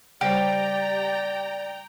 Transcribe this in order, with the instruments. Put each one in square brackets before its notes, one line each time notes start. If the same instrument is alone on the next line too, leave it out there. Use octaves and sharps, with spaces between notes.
[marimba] C#3 G3 C5 [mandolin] G4 [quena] D5 [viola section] G5 A#5